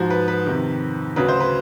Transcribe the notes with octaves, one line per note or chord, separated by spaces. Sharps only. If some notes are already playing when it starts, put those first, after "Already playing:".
Already playing: G#2 F3 F#4
B4
B4
F2 C3 D#3
D2 C#3 F#3 B4
C5
B4